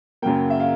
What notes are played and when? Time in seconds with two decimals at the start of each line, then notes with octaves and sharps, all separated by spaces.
0.22 F#2 C#3 F#3 A#3 G5
0.50 E5
0.60 F5